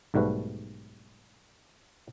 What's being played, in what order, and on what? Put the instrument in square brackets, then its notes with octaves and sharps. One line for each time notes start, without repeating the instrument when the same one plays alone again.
[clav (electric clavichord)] B1 G#2 G3 A3 F#4 B4